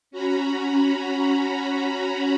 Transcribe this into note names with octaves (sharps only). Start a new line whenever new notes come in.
C#4 F#4 A#5 B5